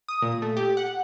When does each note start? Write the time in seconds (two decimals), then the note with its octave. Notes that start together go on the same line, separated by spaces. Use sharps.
0.08 D#6
0.22 A#2
0.42 A3
0.57 G4
0.77 F#5